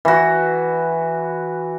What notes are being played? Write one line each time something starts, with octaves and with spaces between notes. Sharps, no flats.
E3 F#4